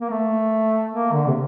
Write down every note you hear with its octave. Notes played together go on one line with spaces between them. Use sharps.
A#3
A3
A#3
D3
C3